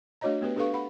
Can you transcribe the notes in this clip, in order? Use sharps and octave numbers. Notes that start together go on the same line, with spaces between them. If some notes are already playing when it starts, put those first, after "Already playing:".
A3 D4 F#4 C#5 D#5 A#5
A3 B3 G4 B4
D4 G4 A4 B4 F5 C#6
F#5 B5